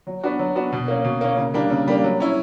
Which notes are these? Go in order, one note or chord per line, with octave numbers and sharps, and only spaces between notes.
F#3
B3 D4 F#4
F#3
B3 D4 F#4
B2
A#3 C#4
B2
A#3 C#4
C#3
G3 A#3 D4
C#3
G3 A#3 D4
F#3
C#4 E4